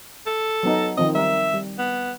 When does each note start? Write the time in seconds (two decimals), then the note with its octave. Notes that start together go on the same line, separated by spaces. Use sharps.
0.27 A4
0.63 F#3 B3 D#4
0.98 D#3 F3 C4 D#5
1.15 G3 A#4 E5
1.54 G3
1.79 B3